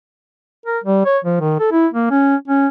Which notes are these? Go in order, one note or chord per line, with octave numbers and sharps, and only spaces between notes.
A#4
G3
C#5
F3
D#3
A4
E4
A#3
C#4
C#4